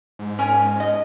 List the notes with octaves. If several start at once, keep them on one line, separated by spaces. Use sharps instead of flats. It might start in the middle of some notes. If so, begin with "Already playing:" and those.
G#2
C#4 A#4 G#5
D#5